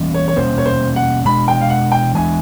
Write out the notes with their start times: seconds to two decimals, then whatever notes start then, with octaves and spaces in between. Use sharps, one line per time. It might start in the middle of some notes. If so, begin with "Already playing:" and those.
Already playing: E3 G3 A#3 C#4
0.14 C#5
0.28 C#5
0.36 B2 G3 A#3 C#4 C5
0.58 C#5
0.66 C5
0.96 F#5
1.25 B2 G#3 B3 D4 B5
1.48 G5
1.61 F5
1.70 F#5
1.92 G5
2.15 E3 G#3 B3 D4 G#5